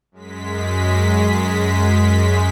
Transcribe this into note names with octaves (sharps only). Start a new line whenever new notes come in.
F#2 G#3 B6